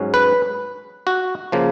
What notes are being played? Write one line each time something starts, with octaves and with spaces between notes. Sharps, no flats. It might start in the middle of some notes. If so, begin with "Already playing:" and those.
Already playing: G#2 F#3 C#4
B4
F#4
C#3 F3 A#3